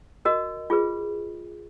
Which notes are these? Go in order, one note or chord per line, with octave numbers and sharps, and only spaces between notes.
F#4 A#4 D#5
F4 G#4 B4